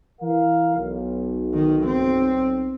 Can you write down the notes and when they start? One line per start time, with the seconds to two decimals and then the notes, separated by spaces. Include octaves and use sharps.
0.22 E3 A#4 F5
0.77 B1
1.54 D#3
1.86 C4